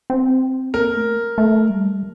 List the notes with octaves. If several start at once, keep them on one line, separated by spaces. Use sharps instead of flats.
C4
A#3 A#4
A3
A3
G3